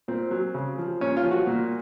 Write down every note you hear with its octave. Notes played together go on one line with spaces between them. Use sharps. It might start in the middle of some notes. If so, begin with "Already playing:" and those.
A#2 C4
F#3
C#3
F3
A#2 C#4
F4
F3
F#4
A#2